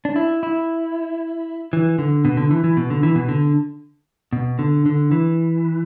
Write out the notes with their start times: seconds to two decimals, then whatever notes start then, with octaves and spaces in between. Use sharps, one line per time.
0.05 D4
0.16 E4
0.43 E4
1.73 E3
1.99 D3
2.25 B2
2.37 D3
2.51 E3
2.64 E3
2.77 B2
2.90 D3
3.03 E3
3.15 B2
3.29 D3
4.33 B2
4.59 D3
4.86 D3
5.11 E3